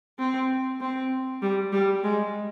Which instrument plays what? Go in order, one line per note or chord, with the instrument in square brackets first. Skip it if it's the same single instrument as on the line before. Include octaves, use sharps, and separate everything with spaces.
[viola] C4
C4
G3
G3
G#3